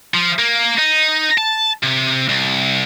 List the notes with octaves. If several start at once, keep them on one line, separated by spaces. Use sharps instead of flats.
F3
A#3
D#4
A5
C3
C2